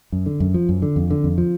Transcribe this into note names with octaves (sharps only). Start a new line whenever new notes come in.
F#2
D3
F#2
F3
F#2
D3
F2
D3
F2
F3